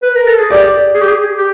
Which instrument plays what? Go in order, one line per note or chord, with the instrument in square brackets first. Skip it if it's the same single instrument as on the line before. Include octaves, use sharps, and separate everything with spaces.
[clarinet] B4
A#4
A4
G#4
[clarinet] G4 [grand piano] D5
[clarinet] G#4
G4
G#4
G4